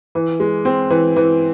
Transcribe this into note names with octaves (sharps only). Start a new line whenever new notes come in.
E3
G#3
C4
E3
E3